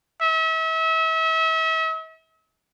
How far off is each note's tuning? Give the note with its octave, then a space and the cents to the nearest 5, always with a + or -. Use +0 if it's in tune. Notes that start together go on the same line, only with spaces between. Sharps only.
E5 -35